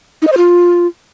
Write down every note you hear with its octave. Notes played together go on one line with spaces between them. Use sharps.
D#4
D#5
C5
F4